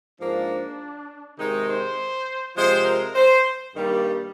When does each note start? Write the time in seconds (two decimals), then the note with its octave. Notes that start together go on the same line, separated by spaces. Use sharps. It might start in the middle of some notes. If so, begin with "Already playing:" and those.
0.20 G#2 F3 A#3 D4
1.38 C3 D#3 G#3 D#4
1.68 C5
2.56 C3 F3 G#3 C5
2.85 A#4
3.15 C5
3.74 G2 D#3 G3 A#3